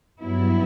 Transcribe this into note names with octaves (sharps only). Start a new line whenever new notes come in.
G2 F#3 B3 E4